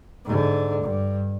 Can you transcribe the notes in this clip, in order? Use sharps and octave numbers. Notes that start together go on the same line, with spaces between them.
G#2 D3
G2